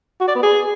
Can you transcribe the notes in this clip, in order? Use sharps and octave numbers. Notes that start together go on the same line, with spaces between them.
F#4
D5
B3
G#4